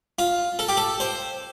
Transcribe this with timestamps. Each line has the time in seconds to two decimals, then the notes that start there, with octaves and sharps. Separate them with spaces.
0.19 F4
0.59 A4
0.69 G4
0.77 A4
1.00 C5